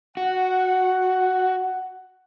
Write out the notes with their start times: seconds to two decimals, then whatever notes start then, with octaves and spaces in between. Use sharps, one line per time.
0.17 F#4 F#5